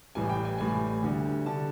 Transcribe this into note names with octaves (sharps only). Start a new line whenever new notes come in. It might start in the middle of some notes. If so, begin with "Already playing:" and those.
A1 A2 E3 G3 G#5
G5
G#5
A1 A2 E3 G3 G#5
D2 D3 G3
D3 G3 A5